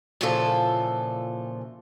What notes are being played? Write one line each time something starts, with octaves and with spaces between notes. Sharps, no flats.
A#2 C#3 E3 F3 F4 A4